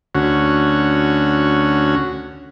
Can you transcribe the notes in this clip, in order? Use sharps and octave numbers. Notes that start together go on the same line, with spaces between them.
D2 C#4 F#4